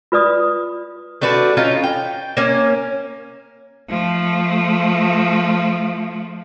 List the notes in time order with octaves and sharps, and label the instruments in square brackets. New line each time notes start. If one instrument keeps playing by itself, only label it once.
[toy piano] F4 B4 D5 D#6
[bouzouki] A3 D4 F#4 B4
C#4 D#4 F4
G5
A#3 C#4
[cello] F3 A3